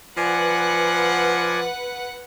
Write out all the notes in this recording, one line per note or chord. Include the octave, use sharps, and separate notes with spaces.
F3 B4 D5 F#5 G#5